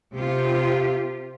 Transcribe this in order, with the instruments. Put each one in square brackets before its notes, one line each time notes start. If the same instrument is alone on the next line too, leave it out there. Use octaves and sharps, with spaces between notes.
[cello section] C3 F4 G4